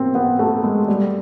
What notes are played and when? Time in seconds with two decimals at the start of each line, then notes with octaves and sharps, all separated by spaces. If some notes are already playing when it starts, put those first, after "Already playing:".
Already playing: A#3 C4
0.15 B3
0.39 A3
0.64 G#3
0.88 G3